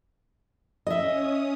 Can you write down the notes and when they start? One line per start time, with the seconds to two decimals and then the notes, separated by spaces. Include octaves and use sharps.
0.87 C#4 D#5 E5 D#6